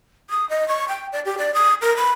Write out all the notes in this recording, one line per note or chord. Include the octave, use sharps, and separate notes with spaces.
D#6
D#5
C#6
G5
D5
G4
D5
D#6
A#4
B5